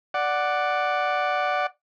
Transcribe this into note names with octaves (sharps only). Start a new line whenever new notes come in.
D5 F#5